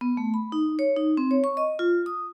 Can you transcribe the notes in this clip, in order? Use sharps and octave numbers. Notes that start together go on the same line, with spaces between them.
B3
A3
B5
D#4
C#5
D#4
C4
C#5
C#6
D#5
F4
D#6